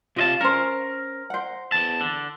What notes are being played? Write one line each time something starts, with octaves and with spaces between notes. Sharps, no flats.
C3 F4 C#5 D#5 F5 A5
C#4 A#4 C5
C5 F#5
E2 A5
D3